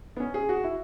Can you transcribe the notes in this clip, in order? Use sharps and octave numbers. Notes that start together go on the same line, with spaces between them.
B3
C#4
G#4
F#4
E4